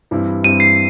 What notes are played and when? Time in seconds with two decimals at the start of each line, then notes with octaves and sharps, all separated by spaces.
0.11 G2 E3 G3 C4 E4
0.44 G2 E3 G3 C4 E4 D#7
0.60 C7